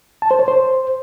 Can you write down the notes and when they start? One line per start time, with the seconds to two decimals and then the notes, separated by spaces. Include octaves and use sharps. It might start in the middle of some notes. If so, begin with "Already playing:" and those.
0.22 A5
0.31 C5
0.39 C#5
0.48 C5